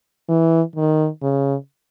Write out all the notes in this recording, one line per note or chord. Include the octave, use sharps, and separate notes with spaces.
E3
D#3
C#3